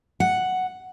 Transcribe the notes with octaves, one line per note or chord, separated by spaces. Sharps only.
F#5